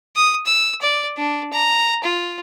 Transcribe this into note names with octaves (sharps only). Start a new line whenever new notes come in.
D#6
E6
D5
D4
A#5
F4